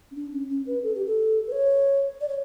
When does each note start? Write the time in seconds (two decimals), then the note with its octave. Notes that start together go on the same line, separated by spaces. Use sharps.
0.11 C#4
0.15 D4
0.32 C#4
0.49 C#4
0.67 B4
0.83 A4
0.95 G4
1.07 A4
1.47 B4
1.52 C#5
2.21 D5
2.28 C#5